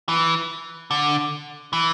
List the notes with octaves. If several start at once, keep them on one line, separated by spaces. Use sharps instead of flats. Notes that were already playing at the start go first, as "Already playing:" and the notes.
E3
D3
E3